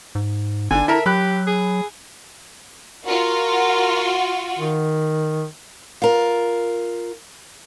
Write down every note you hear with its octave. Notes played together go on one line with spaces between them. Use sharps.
G#2
G1 D3 D4 G#5
E4 A4 A#4 E5 A#5
F#3 G4 B5 F#6
G#4
F4 F#4 A#4
D#3
F4 A#4